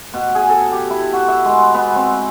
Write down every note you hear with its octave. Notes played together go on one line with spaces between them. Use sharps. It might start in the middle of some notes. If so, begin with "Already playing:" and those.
B2
G#4
A4
G4
E4
F#4
E5
G#3
B3
C4